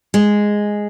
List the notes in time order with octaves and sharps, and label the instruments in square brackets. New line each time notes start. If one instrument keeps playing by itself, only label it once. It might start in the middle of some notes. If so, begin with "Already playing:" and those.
[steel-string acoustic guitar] G#3